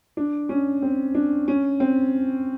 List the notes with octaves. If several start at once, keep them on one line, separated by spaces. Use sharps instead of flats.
D4
C#4
C4
D4
C#4
C4